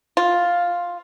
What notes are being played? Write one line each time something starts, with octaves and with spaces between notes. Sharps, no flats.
F4